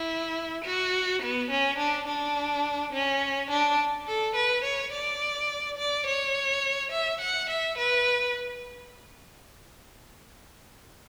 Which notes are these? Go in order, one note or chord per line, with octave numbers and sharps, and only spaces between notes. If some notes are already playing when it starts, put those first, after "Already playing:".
Already playing: E4
F#4
B3
C#4
D4
D4
C#4
D4
A4
B4
C#5
D5
D5
C#5
E5
F#5
E5
B4